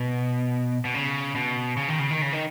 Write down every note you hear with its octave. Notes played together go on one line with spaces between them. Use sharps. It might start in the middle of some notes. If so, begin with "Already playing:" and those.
Already playing: B2
B2
C#3
B2
C#3
D#3
C#3
D#3
C#3
D#3